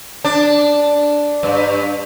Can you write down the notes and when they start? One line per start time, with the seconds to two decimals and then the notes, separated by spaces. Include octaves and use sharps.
0.25 D4
1.43 G2